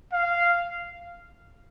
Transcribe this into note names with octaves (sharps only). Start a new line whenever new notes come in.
F5